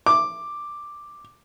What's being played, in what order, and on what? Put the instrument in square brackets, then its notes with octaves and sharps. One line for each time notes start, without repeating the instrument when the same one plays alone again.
[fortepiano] D6